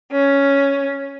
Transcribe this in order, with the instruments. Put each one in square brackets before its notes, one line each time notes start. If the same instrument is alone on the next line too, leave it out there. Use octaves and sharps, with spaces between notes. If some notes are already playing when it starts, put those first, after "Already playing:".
[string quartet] C#4